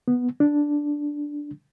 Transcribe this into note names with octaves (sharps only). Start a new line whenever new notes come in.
B3
D4